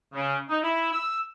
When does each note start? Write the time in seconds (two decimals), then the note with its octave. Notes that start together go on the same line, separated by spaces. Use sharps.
0.14 C#3
0.49 D#4
0.63 E4
0.93 E6